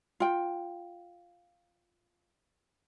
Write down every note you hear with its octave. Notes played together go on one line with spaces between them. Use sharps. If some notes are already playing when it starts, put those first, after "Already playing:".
F4 G5